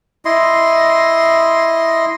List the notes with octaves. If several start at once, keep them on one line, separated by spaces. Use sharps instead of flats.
E4 D#5 C6